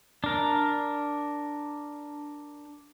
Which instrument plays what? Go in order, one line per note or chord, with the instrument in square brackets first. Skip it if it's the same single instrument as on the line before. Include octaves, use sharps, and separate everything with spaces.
[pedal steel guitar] D4 A#4